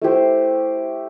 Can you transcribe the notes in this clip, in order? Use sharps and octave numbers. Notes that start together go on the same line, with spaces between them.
A3 E4 G4 C5